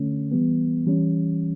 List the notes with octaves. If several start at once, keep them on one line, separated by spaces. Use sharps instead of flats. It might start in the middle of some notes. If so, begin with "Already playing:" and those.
Already playing: D3 A3 C#4
E3 G3 B3
E3 G3 C#4